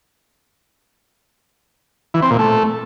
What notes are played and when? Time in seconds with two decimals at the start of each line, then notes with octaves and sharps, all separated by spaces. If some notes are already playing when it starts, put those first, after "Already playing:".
2.14 E3
2.22 C4
2.31 A#2
2.39 A3